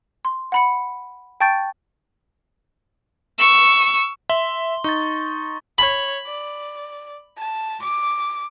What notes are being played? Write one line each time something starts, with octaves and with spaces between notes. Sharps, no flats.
C6
F#5 B5 C#7
G5 A5 C#6 G6 A6 D7
C#6 E6
E5 C6 G7
D#4 C#6 A6
C#5 B5
D5
A5
D6